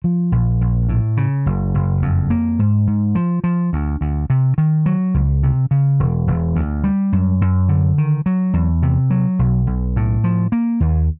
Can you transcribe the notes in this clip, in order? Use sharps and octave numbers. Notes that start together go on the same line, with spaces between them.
F3
A#1
A#1
A2
C#3
F#1
F#1
F2
A#3
G#2
G#2
F3
F3
D2
D2
C3
D#3
F#3
C#2
C3
C#3
E1
E1
D2
G3
F#2
F#2
D3
D#3
F#3
E2
C3
F#3
B1
B1
A2
F3
A#3
D#2